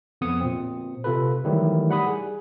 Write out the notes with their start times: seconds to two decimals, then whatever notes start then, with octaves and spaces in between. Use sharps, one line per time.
0.21 F2 B3 D#6 C#7
0.40 A#2 C4
1.04 C3 F4 A4 B4
1.45 D#3 E3 F#3 G3 A3 E4
1.89 G3 F#5 B5 D#6
2.07 G#4